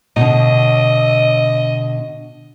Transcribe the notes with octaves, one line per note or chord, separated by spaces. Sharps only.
B2 D3 D#5